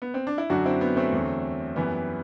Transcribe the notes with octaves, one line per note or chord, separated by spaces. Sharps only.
B3
C4
D4
E4
F#2 D3 F#3 D4 F#4
C4 E4
B3
A3 C4
E2 D3 F#3
F#2 E3 G3 B3